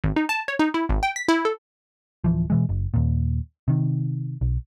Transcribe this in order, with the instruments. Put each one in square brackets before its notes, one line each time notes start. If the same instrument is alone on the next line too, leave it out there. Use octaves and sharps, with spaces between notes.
[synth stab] G#1
D#4
A5
C#5
D#4
E4
G#1
G5
B6
E4
A4
[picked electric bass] D1 E2 E3 F3
B2 E3 G#3
F#1
D#2 A#2
C3 D#3
B1